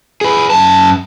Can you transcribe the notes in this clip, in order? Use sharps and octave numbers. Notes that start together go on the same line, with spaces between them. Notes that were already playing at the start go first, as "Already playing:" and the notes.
G#4 B4
F#2 A5